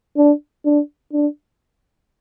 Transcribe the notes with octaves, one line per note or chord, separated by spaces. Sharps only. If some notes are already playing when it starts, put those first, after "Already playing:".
D4
D4
D4